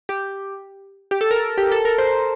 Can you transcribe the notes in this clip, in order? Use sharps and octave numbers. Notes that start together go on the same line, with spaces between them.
G4
G4
A4
A#4
G4
A4
A#4
C5